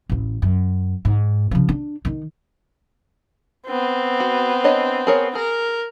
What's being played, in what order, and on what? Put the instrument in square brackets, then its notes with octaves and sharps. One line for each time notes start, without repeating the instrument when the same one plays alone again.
[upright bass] A1 D2
F#2
G#2
C#3 F3
D4
D#3 D#4
[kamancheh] B3 C4
[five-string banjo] F#4
D4 C#5 D#5
G#4 A#4 C#5
[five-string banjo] G#4 [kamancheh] A#4